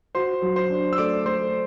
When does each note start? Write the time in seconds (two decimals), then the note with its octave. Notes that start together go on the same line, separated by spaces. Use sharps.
0.15 F#4 C5 C6
0.42 F#3
0.56 C5 C6
0.70 D4
0.93 E6
0.98 A3 D5 D6
1.26 A3 C5 C6